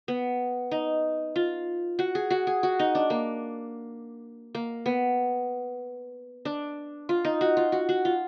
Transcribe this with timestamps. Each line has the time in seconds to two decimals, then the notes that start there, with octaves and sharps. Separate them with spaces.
0.08 B3
0.71 D#4
1.36 F4
1.99 F#4
2.15 G#4
2.30 F#4
2.47 G#4
2.63 F#4
2.79 D#4
2.95 D4
3.10 A#3
4.55 A#3
4.86 B3
6.45 D4
7.09 F4
7.25 D#4
7.41 F#4
7.57 F4
7.72 F#4
7.89 F#4
8.05 F4